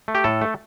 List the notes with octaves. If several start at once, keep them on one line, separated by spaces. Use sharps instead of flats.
A3
G4
A2 A4
A3